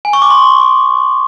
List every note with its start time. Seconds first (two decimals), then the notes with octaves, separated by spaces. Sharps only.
0.05 G#5
0.13 C#6
0.22 D6
0.30 C6